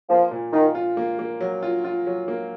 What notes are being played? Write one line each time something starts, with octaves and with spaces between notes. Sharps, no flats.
F3 A#3
A#2
D#3 F4
F4
A#3
A#3
F#3
F4
F4
F#3
A#3